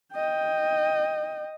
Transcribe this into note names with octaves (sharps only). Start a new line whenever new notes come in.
D#5 G5